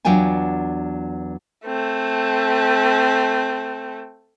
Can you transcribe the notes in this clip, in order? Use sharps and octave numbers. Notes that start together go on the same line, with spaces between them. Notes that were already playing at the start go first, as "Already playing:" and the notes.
E2 F#3 D4 F4 G5 G#5
A3 C4